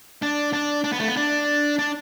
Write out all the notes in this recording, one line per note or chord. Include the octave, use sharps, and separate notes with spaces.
D4
D4
D4
B3
A3
B3
D4
D4